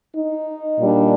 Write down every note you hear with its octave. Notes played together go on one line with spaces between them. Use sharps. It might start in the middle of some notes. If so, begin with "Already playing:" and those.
D#4
A#2 G3 D4